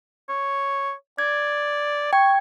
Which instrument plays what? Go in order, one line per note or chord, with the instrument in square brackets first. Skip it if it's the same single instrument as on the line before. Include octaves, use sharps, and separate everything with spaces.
[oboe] C#5
[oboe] D5 [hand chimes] G#6
[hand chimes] G5 G#6 [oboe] C#6